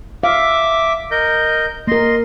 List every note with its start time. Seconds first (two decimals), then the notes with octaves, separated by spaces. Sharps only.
0.23 E5 F5 D6
1.11 A#4 D#5 G6
1.87 A#3 A#4 D#5 C6